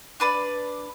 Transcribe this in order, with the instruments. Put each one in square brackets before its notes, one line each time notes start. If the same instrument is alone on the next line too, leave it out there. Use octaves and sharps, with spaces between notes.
[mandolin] D4 B4 D5